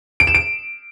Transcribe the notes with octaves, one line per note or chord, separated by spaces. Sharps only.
D7
E7
D7